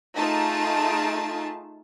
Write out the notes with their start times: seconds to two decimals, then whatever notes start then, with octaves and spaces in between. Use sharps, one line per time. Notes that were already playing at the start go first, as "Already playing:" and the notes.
0.17 A3 D#4 F4 G#4 A5